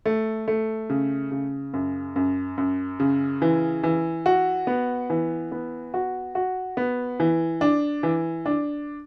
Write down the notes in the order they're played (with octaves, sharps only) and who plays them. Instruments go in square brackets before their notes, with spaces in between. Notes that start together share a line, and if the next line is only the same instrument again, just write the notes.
[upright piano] A3
A3
C#3
C#3
F#2
F#2
F#2
C#3
E3
E3
F#4
B3
E3
B3
F#4
F#4
B3
E3
D4
E3
D4